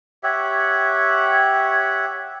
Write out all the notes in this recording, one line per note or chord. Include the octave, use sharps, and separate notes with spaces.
G4 C#5 E5 F#5